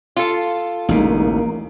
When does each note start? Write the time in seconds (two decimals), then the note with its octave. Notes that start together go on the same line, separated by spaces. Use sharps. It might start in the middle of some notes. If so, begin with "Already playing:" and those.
0.16 F4 A4
0.89 A1 D2 B2 G#3 A#3 D#4